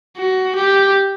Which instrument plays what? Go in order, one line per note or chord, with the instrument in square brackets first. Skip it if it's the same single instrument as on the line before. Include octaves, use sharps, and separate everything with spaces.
[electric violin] F#4
G4